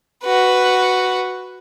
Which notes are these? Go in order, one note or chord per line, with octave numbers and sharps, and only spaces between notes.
F#4 B4